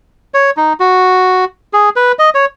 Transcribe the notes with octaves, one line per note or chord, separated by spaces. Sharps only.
C#5
D#4
F#4
G#4
B4
D#5
C#5